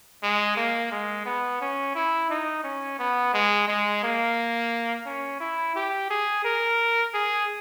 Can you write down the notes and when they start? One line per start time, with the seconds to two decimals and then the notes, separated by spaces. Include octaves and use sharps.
0.23 G#3
0.57 A#3
0.91 G#3
1.25 B3
1.61 C#4
1.95 E4
2.30 D#4
2.64 C#4
2.99 B3
3.34 G#3
3.68 G#3
4.03 A#3
5.06 C#4
5.40 E4
5.76 G4
6.10 G#4
6.45 A#4
7.14 G#4